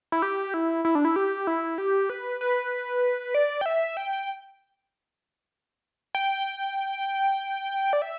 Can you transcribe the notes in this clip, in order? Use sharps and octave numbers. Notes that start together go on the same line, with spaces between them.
E4
G4
E4
E4
D4
E4
G4
E4
G4
B4
B4
D5
G5
E5
G5
G5
D5
E5